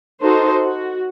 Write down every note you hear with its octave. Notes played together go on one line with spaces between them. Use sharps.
D#4 F#4 A4 C5
F#4